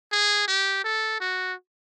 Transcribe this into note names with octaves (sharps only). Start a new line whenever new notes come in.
G#4
G4
A4
F#4